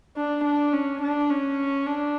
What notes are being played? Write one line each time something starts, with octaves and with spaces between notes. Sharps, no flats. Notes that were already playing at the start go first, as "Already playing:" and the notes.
D4
D4
C#4
D4
C#4
D4